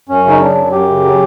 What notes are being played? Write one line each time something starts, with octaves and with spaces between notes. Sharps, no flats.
F#2 C#4
C#3 D#4
F#3 D4
F#2
F#2 G4
C#3
F#3